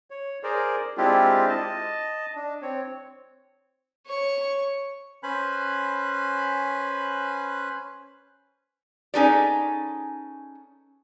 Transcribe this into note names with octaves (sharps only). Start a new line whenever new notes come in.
C#5
G#4 A#4 C5 D5
G#3 C4 D4 E4 F4 G4
D#5 A5
D4
C4 C#5
C#5 C#6
C#4 B4 C5 G#5 B5 F#6
C#4 D#4 G#4 A4 B4 D5